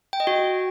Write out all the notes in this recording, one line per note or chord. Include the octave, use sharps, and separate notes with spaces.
G5
D#5
F#4